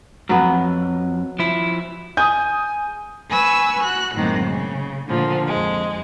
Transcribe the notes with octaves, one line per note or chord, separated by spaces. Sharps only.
F2 G#2 F#3 B3
F3 E4
G#4 G#5 D#6 G6
B4 G#5 C#6 E6
F#4 F#6
F#2 A2 D#3 G#3 A#3 C4
C#3
A#2 D3 F3
F2 G#3